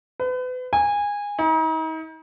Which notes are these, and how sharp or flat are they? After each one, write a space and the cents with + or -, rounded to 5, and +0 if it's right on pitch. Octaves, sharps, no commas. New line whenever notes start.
B4 +35
G#5 -20
D#4 +40